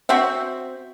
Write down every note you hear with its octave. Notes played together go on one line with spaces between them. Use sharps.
C4 F#4 E5